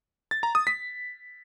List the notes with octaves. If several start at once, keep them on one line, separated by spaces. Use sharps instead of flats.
A6
A#5
D#6
B6